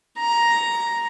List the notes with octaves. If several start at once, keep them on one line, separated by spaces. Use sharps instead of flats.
A#5